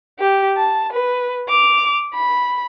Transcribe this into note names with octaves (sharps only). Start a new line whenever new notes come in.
G4
A5
B4
D6 F7
B5